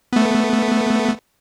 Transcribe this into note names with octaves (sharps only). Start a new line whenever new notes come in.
A3 B3